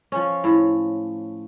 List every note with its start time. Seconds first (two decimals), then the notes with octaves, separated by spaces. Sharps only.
0.12 F3 C#4
0.44 A2